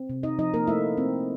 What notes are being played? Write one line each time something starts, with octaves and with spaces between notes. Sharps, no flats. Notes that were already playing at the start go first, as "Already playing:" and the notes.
Already playing: C4
C3
D#4 D#5
F3 D#4 D#5
A#3 A#4
A3 E4 E5
C4